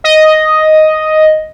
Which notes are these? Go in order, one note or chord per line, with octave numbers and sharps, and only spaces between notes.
D#5